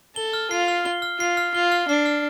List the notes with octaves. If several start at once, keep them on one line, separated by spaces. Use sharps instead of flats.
A4 G7
F6
F4 C7
F6
G7
F6
F4 C7
F6
F4 G7
F6
D4 C7
F6